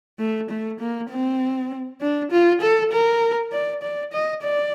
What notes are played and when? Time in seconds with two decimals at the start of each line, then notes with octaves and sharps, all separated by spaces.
0.19 A3
0.50 A3
0.80 A#3
1.10 C4
2.02 D4
2.32 F4
2.62 A4
2.92 A#4
3.53 D5
3.83 D5
4.13 D#5
4.43 D5